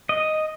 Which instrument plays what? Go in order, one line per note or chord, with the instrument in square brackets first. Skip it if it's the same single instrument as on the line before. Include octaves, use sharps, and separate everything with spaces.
[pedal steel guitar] D#5